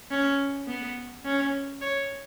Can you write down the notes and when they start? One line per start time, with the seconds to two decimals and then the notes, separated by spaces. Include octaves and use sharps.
0.11 C#4
0.68 B3
1.25 C#4
1.81 C#5